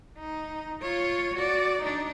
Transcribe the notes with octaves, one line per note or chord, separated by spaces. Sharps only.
D#4
F4 C#5
F#4 D5
D4 D#4